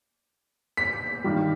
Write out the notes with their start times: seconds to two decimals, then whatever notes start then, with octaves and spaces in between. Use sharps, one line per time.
0.77 B6
1.24 G2 D#3 G3